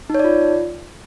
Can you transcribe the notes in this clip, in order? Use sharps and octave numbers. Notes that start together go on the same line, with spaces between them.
D#4 F4 C#5 D5